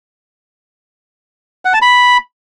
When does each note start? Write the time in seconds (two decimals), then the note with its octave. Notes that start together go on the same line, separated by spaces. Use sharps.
1.65 F#5
1.73 A5
1.82 B5